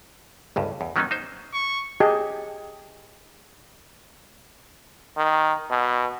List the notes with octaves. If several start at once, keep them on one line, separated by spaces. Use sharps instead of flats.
G1 C#2 G2
E2
D#3 F#3 A#3 B3 C#4 D#4
D#4 C5
C#6
G4 G#4 D#5 G5 A5
D#3
B2